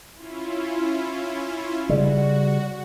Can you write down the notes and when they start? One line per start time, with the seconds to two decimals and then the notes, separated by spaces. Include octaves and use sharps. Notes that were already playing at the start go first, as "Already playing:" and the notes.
0.14 C#4 E4 F4
1.89 C#3 G3 F#4